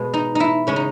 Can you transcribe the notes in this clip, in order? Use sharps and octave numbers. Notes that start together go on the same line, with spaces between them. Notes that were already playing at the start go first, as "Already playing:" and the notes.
Already playing: B2 G#3
D#4
D#4 E4
C#3 G#3 C#4
D#4